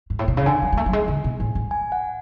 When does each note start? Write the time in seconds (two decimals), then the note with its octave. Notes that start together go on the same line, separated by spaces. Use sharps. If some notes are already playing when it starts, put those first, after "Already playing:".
0.10 G#2
0.19 A2
0.28 B2
0.37 C#3
0.46 D3 G#5
0.62 F#3
0.72 G#3
0.77 A3
0.86 F#3
0.93 G#3
1.08 D3
1.24 B2
1.40 A2
1.55 G#2
1.71 G#5
1.92 F#5